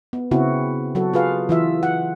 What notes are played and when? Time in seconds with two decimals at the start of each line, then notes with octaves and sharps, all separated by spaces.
0.13 B3
0.31 C#3 B3 C4 E4 F#4
0.95 F#3 F#4 A4
1.13 F4 G#4 B4 F5
1.49 E3 F4 E5
1.83 F#5